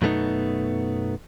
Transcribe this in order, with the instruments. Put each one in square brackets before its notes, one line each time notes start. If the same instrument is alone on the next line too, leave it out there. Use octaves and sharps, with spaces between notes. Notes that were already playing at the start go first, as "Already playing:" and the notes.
[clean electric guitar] F#2 B2 A3 B3 D#4